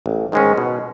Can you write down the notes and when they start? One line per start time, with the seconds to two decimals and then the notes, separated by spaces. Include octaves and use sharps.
0.06 A1
0.32 G#2 D#3 G#3 C#4
0.57 B2